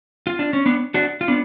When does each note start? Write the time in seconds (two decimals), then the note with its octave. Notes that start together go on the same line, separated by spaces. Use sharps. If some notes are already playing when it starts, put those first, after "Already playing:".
0.27 F4
0.39 D4
0.53 C#4
0.66 B3 D4
0.94 D4 F#4
1.21 F4
1.28 B3 D4